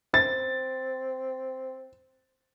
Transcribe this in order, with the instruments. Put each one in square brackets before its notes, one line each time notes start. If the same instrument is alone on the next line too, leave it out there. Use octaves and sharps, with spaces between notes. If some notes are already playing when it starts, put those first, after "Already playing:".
[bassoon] C4 [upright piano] A6